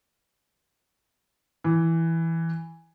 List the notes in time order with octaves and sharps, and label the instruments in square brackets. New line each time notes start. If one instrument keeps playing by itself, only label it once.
[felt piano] E3